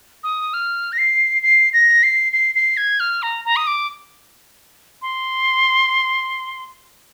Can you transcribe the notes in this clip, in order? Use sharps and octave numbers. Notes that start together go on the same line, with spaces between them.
D#6
F6
A#6
C7
C7
A#6
C7
C7
C7
G#6
F6
A#5
A#5
D#6
D6
C6